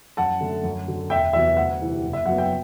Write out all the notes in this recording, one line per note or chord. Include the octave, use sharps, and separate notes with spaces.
F#2 F#5 A5
D3 A3
F#2
D3 F#3
E1 E5 G5
E2 C3 F#3 B3 E5
D2 F#5
C3 E3 G3
F#1
E5
F#2 F#3 B3 F#5
G5